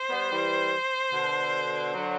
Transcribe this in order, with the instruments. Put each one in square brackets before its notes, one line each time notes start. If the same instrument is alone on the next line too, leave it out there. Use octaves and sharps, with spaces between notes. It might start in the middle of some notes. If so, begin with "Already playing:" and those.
Already playing: [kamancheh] C5
[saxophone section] G3 B3
E3 G3
B2 D3
D3 F#3